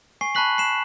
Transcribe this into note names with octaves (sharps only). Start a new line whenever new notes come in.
G#5 C#6 C7
A5 B5 C#6 F#6 B6 F#7
C7 E7